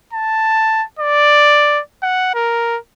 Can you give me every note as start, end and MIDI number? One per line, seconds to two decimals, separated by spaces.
0.13 0.84 81
0.99 1.81 74
2.03 2.32 78
2.34 2.78 70